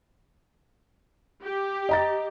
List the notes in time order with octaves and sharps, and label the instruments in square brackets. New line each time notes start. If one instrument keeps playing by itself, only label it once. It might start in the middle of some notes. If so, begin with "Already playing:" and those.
[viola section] G4
[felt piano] D#5 A#5 A6